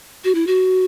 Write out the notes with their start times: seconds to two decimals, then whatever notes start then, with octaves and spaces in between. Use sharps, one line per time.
0.24 F#4
0.35 E4
0.47 F#4